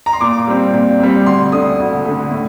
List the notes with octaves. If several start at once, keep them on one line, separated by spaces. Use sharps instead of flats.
A#5
C6
A#2 D6
G3 C4
A#2
G3 C4
D2 C6
D3 A3 D#6
D2
D3 A3
A2